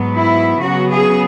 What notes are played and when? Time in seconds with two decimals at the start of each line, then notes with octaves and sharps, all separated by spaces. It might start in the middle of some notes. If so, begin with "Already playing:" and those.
Already playing: G#2 F#3 B3
0.15 E4
0.60 C#3 F#3 B3 F#4
0.90 G#4